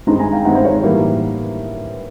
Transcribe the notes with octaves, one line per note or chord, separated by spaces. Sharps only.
G2 D#3 G#3 C4 A#5 C6
G#5 A#5
F5 G5
G2 D#3 G#3 C4 E5 F#5
C5
C#5
A2 E3 G3 A#3